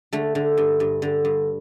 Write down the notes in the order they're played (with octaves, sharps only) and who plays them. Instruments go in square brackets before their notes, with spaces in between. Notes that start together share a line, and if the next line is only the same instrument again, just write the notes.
[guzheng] D3 A3
D3
G2
G2
D3
G2